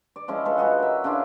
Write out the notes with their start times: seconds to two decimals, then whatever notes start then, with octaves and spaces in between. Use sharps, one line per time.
0.16 D5
0.28 F3 G#3 C#4 E4
0.45 G#3 A4 B4
0.58 G#3 F#4 D#5 F#5
0.79 A#4 E5
1.04 C#3 D4 E4 F4